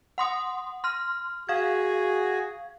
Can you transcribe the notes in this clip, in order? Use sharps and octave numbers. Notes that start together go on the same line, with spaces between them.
F#5 C6 D#6
C6 F6
F#4 G#4 F5 G#6